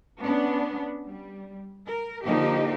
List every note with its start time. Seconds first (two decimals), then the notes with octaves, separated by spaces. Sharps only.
0.21 B3 C#4 D4
1.05 G3
1.87 A#4
2.24 D3 F3 A#3 D#4 G4 D#5